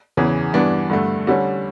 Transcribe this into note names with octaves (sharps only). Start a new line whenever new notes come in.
E2 C#3 E3
G2 E3 B3 D4
G2 D3 A3
D3 G3 C#4